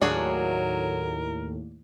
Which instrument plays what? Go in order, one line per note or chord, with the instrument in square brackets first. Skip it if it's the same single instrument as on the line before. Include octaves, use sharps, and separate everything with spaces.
[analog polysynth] D#2 A2 [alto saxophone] F#3 [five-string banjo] D4 F#4 G#4 [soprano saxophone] A#4